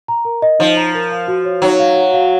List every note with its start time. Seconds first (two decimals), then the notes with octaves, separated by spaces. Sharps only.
0.08 A#5
0.25 A#4
0.42 D#5
0.59 F3 D#4
0.77 A#5
0.94 A#4
1.11 F5
1.28 F#4
1.45 C#5
1.62 F#3 D#4
1.80 F5
1.96 F#4
2.13 F5